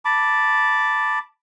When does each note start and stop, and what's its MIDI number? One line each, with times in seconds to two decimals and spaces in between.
0.05 1.19 81
0.05 1.19 83
0.05 1.19 86